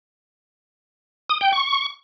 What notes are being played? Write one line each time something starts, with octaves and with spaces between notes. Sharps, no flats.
D#6
G5
C#6